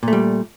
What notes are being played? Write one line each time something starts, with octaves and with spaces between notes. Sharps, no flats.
A#2 G3 A3